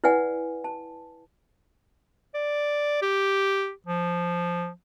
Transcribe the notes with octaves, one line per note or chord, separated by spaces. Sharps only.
E4 B4 D5 F#5 G#5
A5
D5
G4
F3